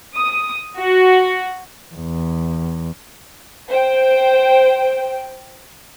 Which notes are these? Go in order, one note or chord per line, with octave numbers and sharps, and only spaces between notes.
D#6
F#4
E2
C5 G5